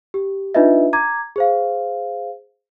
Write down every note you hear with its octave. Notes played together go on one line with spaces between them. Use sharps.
G4
D4 D#4 F4 B4 D#5 E5
A#5 D6 G#6
G#4 C5 F5